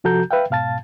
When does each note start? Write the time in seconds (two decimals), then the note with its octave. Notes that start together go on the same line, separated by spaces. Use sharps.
0.04 C3 F3 F#4 A4 A#5 G6
0.31 B4 E5 F5 G5
0.50 G#2 B2 F5 A5 A6